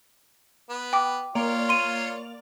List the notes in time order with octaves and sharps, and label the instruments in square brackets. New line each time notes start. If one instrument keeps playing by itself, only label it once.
[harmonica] B3
[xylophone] G5 D6
[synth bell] A#3 D5 F7 [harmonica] F4 C#5
[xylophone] C6 D#7